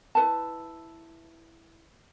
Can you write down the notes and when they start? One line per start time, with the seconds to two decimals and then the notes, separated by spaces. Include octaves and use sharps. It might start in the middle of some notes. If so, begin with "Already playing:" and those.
0.15 E4 B4 A5